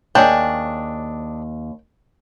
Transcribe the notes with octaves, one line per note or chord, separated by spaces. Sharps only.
D#2 D4 G#4 C#5 G5